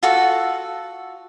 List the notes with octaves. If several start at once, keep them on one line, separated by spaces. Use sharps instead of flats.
F4 F#4 A4